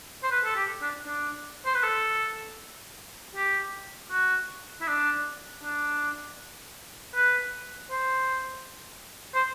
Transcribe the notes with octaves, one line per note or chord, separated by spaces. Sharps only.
C5
B4
A4
G4
D4
D4
C5
B4
A4
G4
F#4
E4
D4
D4
B4
C5
C5